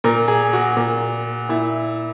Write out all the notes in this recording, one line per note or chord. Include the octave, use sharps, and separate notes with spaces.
A#2 A#4
G#4
F#4
A#2
A#2 E4